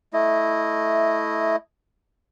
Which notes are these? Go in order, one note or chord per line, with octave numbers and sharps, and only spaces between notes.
A3 E4 D#5